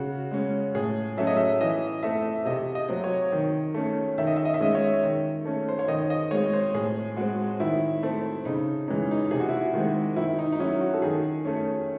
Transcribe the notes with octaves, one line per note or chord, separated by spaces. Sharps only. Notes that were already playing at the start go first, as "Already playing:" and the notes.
Already playing: C#3 F#4
G#3 C#4
A2 G#4
F#3 A3 C#4 E5
D#5
E5
E3 D#5
A3 C4 E5
C3 D#5
D#5
F#3 C4
C#5
D#3
A3 C#4
D#3 E5
D#5
E5
D#5
E5
G#3 C#4 D#5
C#5
D#3
A3 C#4
C5
C#5
D#3 D#5
D#5
G#3 C4 C#5
C5
A2 G#4
G#3 C4 F#4
D#3 E4
A3 C4
C#3 D#4
E3 G#3 C#4 D#4
D#4
C3 G#4
F#4
E4
F#4
D#3 G#3 C4
D#3 E4
D#4
D#4
F#3 C#4 E4
F#4
A4
D#3 G#4
A3 C#4